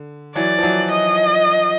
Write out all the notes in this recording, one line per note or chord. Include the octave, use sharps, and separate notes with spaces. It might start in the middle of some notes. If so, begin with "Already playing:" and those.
Already playing: D3
E3 F#3 D5
F3
E3 F#3
D#5